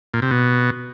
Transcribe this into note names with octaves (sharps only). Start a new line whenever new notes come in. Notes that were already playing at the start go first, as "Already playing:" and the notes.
A#2
C3
B2